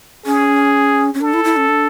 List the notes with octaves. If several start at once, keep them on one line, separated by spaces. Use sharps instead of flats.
C#4 G#4
C#4
D4 A4
E4
E4
C#4
D4